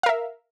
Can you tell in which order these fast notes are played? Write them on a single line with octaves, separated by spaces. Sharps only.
F5 A#4 E5